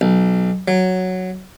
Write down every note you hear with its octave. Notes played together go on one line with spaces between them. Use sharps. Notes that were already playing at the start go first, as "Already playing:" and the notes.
B1
F#3